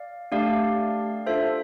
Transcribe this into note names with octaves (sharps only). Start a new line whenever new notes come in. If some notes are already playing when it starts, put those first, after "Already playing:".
Already playing: D5 F5
A3 D4 G4 D5 F5
D4 F4 A4 C5 E5